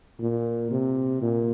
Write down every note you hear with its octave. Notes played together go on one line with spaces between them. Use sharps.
A#2
C3
A#2